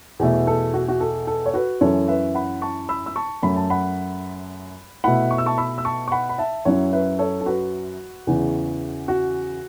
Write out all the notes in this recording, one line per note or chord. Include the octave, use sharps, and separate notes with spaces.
E2 B2 A3 E4
A4
F#4
F#4
A4
A4
C#5
F#4 B4
F#2 E3 C#4 E4 A4 C#5
B4 E5
F#5 B5
A5 C#6
B5 E6
E6
A5 C#6
F#2 F#3 A3 B5
A5
F#5 B5
B2 A3 E4 F#5 B5
C#6
E6
A5 C#6
B5 E6
E6
A5 C#6
C#6
F#5 B5
B5
E5 A5
F#2 F#3 C#4 E4 C#5 F#5
B4 E5
A4 C#5
A4
F#4 B4
E2 C#3 E3
F#4